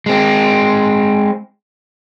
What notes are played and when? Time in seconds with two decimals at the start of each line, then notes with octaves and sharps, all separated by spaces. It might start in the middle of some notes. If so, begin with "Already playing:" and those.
0.06 G#3 C4